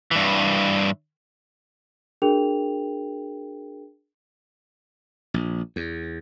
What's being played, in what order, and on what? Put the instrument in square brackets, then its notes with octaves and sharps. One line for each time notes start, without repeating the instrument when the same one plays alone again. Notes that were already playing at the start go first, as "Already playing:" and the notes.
[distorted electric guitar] G2 E3
[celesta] D4 F#4 G#4 A#4 G5 F7
[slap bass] A#1
E2